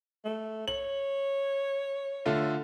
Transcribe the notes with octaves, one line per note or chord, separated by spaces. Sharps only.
A3
C#5 F#7
D3 A3 F4